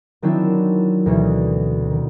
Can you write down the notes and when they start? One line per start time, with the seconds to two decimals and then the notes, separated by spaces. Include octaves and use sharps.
0.22 D#3 F#3 C4 D4 E4
1.06 D2 B2 E3
1.91 D#3